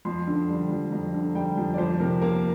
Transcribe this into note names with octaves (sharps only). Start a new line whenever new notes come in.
F2 C6
D3
G3
F2
F2 A#5
D3
G3 G5
F2
D5
F2 C5
C3 A#4
A#3 A#4